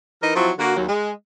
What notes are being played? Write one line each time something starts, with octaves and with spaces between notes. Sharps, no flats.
E3 D#4 A#4
F3 F#3 C4 E4 F4
D3 A#3 F#4
D#2 F#3
G#3